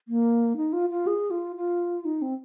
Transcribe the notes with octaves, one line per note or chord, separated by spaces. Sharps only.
A#3
D#4
F4
F4
G#4
F4
F4
D#4
C4